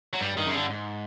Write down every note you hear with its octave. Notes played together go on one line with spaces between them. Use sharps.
F#3
G2 G3
G2 D#3
F#2 C#3
G2 D3
G#2